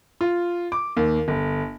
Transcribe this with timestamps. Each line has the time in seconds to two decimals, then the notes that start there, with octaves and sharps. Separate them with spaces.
0.21 F4
0.72 D6
0.97 D#2
1.28 G1